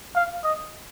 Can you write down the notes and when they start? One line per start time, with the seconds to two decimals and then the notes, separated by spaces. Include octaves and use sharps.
0.15 F5
0.44 D#5